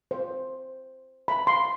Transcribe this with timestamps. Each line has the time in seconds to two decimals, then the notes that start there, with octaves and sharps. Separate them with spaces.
0.11 C5
1.28 B5
1.47 C6